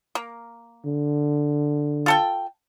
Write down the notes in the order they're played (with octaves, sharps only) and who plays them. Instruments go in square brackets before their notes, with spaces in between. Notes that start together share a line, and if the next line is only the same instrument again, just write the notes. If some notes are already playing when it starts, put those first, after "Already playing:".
[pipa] A#3
[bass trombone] D3
[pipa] F4 A4 G5